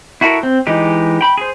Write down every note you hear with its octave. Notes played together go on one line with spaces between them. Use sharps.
E4 F#4 A4 A#4
C4
E3 G#3 D#4 G4
G5 B5
G#4 C5